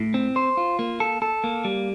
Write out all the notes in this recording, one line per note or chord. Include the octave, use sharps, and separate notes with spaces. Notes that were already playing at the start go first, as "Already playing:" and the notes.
Already playing: A2
C4
C5
F4
A#3
A4
A4
A#3
G3